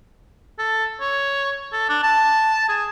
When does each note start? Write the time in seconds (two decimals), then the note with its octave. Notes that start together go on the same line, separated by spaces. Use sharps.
0.59 A4
1.00 C#5
1.72 A4
1.89 D4
2.03 A5
2.69 G#4